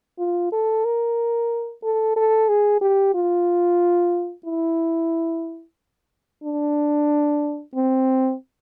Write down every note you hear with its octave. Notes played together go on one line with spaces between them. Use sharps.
F4
A4
A#4
A4
A4
G#4
G4
F4
E4
D4
C4